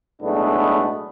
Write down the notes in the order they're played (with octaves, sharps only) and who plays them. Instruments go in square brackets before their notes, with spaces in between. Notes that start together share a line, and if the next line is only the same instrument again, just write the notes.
[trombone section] B1 A2 G#3 A3 B3 D4